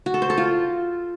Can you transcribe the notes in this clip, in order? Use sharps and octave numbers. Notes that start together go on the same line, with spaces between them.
F#4
A4
C5
A4
F4